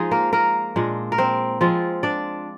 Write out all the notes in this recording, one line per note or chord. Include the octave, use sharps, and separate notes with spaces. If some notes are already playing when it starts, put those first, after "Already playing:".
Already playing: F3 G#3 D#4 G#4
A#3 A#4
A#3 A#4
A#2 G#3 D4
A#4
C4 C5
F3 G#3 C4 F4
D4 D5